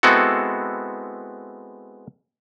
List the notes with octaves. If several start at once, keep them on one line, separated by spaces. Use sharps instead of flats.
G#3 B3 C4 E4 F#4 A4